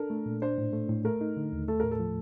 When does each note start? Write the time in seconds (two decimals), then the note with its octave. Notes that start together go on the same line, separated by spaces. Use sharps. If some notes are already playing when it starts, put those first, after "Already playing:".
Already playing: D4 A4 A#4
0.10 A3
0.26 A#2
0.42 D4 C5
0.58 A2
0.73 A3
0.89 A2
1.05 A3 A#4
1.21 D#4
1.37 D3
1.53 D#2
1.68 A3 A4
1.80 A2 A#4
1.91 A4
2.00 F3